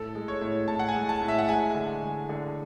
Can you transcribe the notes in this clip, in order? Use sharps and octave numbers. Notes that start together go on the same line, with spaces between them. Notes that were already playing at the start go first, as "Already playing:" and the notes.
Already playing: A2 A4
G#3
C#5
A2
A2 A5
F#5
G#5
G#3
A5
A2
E5
F#5
G#3 G#5
D3
G#3
D3